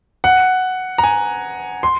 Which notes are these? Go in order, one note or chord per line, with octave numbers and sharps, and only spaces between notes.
F#5
A#5
G#5
C6